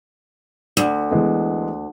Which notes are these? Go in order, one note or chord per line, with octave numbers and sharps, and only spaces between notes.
D2 D5
E3 G#3 B3